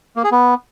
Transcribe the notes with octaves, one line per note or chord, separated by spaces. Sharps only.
A#3
G#4
B3